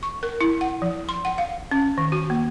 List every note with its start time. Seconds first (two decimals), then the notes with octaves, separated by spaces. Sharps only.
0.03 C#6
0.23 A#4
0.41 E4
0.61 F#5
0.82 F3
1.09 C6
1.25 F#5
1.38 F5
1.71 C#4
1.98 D#3
2.12 F#4
2.30 A#3